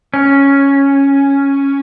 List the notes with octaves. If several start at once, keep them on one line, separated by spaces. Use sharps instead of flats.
C#4